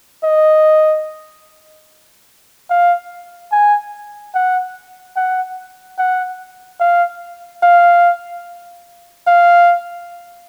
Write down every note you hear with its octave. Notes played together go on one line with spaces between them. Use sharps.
D#5
F5
G#5
F#5
F#5
F#5
F5
F5
F5